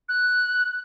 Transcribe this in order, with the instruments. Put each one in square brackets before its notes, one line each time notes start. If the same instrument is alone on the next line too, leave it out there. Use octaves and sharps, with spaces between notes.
[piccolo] F#6